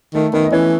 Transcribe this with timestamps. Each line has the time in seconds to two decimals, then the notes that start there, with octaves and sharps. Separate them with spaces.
0.14 D#3 A3 A4
0.33 D#3 B3 B4
0.45 D#5
0.51 E3 C#4 C#5